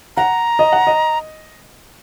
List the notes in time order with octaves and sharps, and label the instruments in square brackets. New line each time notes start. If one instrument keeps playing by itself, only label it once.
[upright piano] F#5 [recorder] A#5
[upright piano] D#5
F#5
D#5